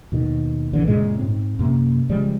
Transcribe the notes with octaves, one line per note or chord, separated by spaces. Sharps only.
D#2 B2 D#3
A#1 D3 E3
F#2 A#2 C#3 G#3
G#2 C4
F#2 C3 A#3
C#3 F3 G3 G#3